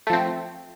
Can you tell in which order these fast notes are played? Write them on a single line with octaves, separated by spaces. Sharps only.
A3 F3 C4